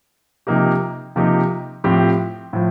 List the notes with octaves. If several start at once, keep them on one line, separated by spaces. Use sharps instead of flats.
C3 F3 A#3 D#4 G4
C3 F3 A#3 D#4 G4
A2 F3 C4 G4
A2 F3